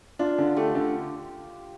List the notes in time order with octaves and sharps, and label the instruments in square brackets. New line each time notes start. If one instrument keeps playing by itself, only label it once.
[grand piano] D4 [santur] F4
[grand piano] D3
[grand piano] A3 [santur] G4
[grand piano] D3